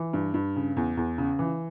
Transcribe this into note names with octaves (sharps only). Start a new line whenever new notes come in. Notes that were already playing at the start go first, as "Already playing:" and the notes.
Already playing: E3
G2
G2
C#3
E2
E2
C#3
E3